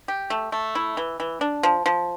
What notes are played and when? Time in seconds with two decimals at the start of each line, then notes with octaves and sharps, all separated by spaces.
0.08 G4
0.30 A3
0.52 A3
0.75 E4
0.97 E3
1.20 E3
1.41 D4
1.63 F3
1.86 F3